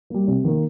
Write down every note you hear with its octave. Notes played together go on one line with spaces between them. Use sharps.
G3 A#3
C3
D#3 A#3